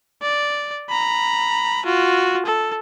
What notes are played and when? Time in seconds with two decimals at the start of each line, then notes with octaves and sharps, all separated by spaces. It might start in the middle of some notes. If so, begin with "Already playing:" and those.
0.22 D5
0.89 A#5 B5
1.85 F4 F#4
2.46 A4